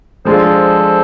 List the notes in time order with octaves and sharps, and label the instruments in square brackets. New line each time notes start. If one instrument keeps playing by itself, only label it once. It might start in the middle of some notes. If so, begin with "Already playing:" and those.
[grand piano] F3 G#3 D4 F4 [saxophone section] A4 C5